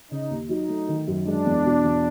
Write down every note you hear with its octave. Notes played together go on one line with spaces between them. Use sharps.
C#3 D#4
D#2
F#3 D#4
A3
D#3
F#2
G#3 D4
E2
B2
E2